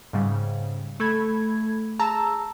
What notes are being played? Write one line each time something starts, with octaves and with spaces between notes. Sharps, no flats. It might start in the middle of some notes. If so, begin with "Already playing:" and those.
G#2 C#3 G3
A3 A4 B5 G#6
G#4 A5 A#5 E6